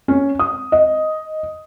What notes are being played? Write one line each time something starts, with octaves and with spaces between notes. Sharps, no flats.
C#4
D#6
D#5